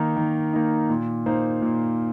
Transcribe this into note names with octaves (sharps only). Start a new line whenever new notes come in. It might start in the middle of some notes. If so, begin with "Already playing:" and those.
Already playing: D#3 A#3 D#4
D#3
A#3 D#4
A#2
A#3 D#4 C5
A#2